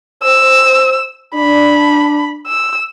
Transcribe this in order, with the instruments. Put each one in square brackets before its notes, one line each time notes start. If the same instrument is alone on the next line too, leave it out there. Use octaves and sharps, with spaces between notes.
[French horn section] C5 [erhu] E6
[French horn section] D4 [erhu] B5
[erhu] E6